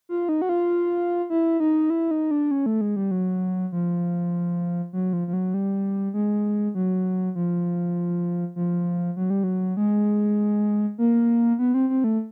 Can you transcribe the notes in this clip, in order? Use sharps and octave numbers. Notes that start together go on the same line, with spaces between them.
F4
D#4
F#4
F4
E4
D#4
E4
D#4
D4
C#4
A3
G#3
G3
F#3
F3
F#3
F3
F3
F#3
G3
G#3
F#3
F3
F3
F#3
G3
F#3
G#3
A#3
B3
C4
C4
A3